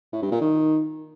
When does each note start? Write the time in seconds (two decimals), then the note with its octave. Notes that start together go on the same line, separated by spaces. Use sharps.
0.13 A2
0.22 G2
0.32 A#2
0.41 D#3